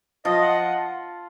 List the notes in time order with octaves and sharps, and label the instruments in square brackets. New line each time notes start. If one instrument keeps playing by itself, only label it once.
[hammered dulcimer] F3 F4 [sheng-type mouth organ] D#5
[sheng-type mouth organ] F#5